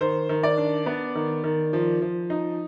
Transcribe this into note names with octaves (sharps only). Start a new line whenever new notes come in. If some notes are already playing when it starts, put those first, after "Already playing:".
D#3 C5
D#3
D5
D4
B3
D#3
D#3
F3
F3
D#4